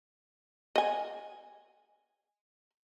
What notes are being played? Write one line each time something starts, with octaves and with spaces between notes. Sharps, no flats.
D#5 G#5